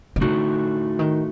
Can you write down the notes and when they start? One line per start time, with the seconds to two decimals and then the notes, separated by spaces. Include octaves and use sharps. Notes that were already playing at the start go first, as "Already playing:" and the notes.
0.16 D#3
0.21 A2 D3 A3 D#4 F#4
0.99 D#3